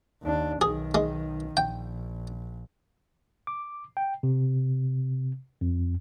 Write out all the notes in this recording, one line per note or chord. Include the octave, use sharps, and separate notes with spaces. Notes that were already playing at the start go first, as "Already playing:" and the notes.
D#2 D4
B1 D#3 G#4
G#3
A#1 G5
D6
G5
C3
F2